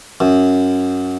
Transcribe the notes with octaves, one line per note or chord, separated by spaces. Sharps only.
F#2